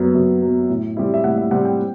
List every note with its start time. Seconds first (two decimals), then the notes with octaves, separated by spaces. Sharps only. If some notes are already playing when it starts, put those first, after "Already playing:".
Already playing: F#2 F#3 B3
0.15 F#2
0.42 F#3 B3
0.69 A2
0.97 G3 C4 E4
1.14 E5
1.24 A2 F#5
1.38 E5
1.51 G3 C4 E4 F#5
1.65 G5